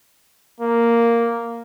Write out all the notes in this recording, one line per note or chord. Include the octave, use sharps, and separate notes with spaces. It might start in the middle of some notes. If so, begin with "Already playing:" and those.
A#3